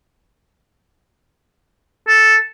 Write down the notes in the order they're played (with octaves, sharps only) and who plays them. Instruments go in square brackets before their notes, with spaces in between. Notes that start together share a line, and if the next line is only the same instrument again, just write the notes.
[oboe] A4